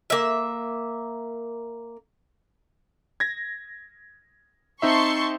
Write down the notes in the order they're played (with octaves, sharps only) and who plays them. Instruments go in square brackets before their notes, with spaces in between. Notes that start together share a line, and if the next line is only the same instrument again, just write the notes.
[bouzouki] A#3 E5
[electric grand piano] G#6 A#6
[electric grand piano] C4 D#4 E5 [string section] A5 C6 C#6